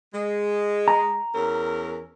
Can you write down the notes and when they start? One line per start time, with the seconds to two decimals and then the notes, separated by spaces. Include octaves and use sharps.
0.12 G#3
0.88 A#5
1.35 E2 C#4 A#4